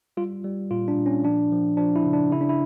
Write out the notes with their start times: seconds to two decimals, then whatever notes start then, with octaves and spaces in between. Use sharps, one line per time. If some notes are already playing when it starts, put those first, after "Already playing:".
0.17 G3 F4
0.44 G3
0.71 A#2 F4
0.88 D4
0.97 A#2
1.06 C#4
1.24 F3 D4
1.52 F3
1.77 F3 D4
1.96 E4
2.05 C#3
2.13 D4
2.31 C#3 E4
2.41 D4
2.49 E4